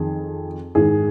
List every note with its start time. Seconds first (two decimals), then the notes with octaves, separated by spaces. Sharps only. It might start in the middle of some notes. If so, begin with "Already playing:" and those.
Already playing: F2 D#3 G#4
0.75 G#2 D#3 G#4